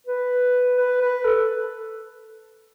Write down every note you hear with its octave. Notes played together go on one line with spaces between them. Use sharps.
B4
B4
B4
A4